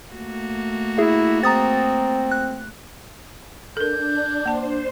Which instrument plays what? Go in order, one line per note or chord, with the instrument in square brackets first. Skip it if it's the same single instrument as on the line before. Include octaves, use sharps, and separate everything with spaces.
[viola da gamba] A3 A#3 F#4
[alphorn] E4 [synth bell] G#4
[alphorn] C4 [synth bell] A#5 D#6 A6
[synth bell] F#6
[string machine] D4 [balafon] A4 A#4 [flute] G6
[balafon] A#3 A5 [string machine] C5